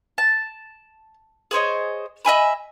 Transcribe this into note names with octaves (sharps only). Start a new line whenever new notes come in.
A5
G#4 C5 C#5 D#5
D#5 E5 G#5 B5